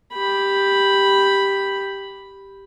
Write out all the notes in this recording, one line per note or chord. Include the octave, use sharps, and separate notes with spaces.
G4 B5